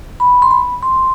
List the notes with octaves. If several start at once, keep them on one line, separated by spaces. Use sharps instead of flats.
B5
C6
B5
C6